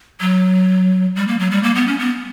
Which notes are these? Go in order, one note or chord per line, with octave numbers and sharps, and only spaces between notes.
F#3
G3
A#3
F#3
G3
A#3
B3
C#4
B3